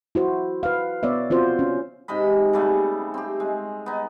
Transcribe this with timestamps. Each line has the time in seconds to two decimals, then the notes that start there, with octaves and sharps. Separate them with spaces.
0.15 E4 F#4 C5
0.63 B4 F5
1.03 B3 C#5 D5 E5
1.30 C4 F4 F#4 C5
1.59 C#4
2.08 G#2 C3 D#5 B5
2.53 C#3 G3 A3 B3
3.14 C4 G4
3.40 G#3
3.86 B3 D#4